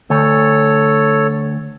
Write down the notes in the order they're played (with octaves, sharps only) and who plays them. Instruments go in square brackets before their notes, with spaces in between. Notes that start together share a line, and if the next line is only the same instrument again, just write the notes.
[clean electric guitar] D2 [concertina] A4 C#5